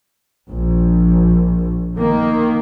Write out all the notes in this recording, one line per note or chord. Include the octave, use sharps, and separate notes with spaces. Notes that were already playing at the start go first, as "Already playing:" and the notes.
A#1
D#3 A#3